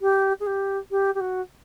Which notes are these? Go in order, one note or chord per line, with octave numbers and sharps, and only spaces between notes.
G4
G#4
G4
G4
G4
F#4